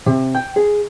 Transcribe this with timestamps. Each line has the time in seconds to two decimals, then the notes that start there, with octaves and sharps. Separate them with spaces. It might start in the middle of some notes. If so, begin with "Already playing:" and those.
0.06 C3
0.35 G5
0.56 G#4